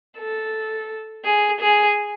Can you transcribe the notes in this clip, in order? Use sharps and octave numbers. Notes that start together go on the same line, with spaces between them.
A4
G#4
G#4